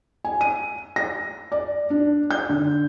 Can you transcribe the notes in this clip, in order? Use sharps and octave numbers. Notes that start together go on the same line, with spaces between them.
G#5
D#7
A#6
D5
D4
G6
D3